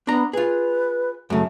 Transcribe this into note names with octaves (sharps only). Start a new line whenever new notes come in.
B3 D4 A#5
F4 G#4 B4
F#2 C#3 A3